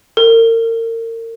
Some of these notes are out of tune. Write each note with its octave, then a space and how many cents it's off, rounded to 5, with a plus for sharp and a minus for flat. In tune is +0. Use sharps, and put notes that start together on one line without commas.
A#4 -35